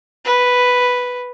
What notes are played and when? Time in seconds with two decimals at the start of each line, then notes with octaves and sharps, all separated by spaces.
0.25 B4